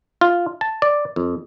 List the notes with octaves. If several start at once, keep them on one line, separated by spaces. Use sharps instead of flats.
F4
A5
D5
F2